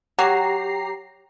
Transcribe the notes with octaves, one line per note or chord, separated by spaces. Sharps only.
F#3 G4 A#5 C7